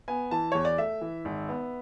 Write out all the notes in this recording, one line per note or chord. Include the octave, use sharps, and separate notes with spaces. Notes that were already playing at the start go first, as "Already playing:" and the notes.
B3 G#5
E3 A5
E2 C#5
D5
A3 E5
E3
G#1
B3